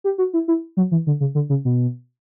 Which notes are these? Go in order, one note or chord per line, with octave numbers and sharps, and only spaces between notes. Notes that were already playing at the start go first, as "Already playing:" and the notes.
G4
F#4
E4
E4
F#3
E3
D3
C#3
D3
C#3
B2